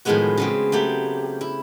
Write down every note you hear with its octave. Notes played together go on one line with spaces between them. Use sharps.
A2 D#3 F3 G#3 B3 F#4
C#3 B3 C4
F#3 A3 G4
E4